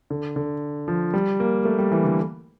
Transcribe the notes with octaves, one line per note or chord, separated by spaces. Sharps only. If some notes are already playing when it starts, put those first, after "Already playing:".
D3
D3
F3
G3
A#3
A3
G3
E3
D3